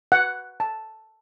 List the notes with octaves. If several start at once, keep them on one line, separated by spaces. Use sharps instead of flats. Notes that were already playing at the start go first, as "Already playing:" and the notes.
F#5
A5